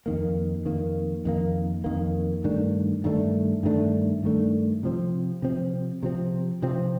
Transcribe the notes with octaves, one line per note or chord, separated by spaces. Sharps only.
F2 D#3 A#3
F2 D#3 A#3
F2 D#3 A#3
F2 D#3 A#3
G2 D#3 A3 D4
G2 D#3 A3 D4
G2 D#3 A3 D4
G2 D#3 A3 D4
C3 F3 C4
C3 F3 C4
C3 F3 C4
C3 F3 C4